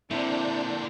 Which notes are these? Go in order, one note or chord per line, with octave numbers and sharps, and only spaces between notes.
A#2 D3 C4 D4 E4 G6